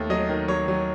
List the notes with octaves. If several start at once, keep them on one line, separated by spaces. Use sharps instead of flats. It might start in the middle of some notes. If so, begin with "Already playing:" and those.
Already playing: D#2 A3
F#3 D#5
D#3
F#3 C#5
F#3